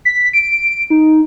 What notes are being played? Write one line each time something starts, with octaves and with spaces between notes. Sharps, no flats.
B6
D7
D#4